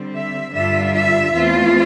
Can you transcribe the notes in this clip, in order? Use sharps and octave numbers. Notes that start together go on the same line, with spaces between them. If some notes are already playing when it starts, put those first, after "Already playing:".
Already playing: D3 G3 C4
E5
G2 D3 G3 D4 F4 E5
E5
E2 E3 A3 C4 F4